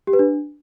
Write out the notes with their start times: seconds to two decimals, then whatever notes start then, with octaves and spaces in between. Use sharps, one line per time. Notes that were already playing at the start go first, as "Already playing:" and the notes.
0.07 G4
0.13 B4
0.19 D4